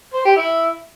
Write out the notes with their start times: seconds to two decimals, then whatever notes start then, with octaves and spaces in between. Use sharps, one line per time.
0.14 C5
0.25 G4
0.37 E4